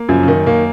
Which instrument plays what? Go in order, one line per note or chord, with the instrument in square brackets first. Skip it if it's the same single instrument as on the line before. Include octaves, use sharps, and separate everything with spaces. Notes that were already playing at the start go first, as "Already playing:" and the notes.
Already playing: [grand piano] A#3
[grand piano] F#2 [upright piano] C#3 F3
[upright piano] C#3
D#3
[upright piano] D#3 [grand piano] A#3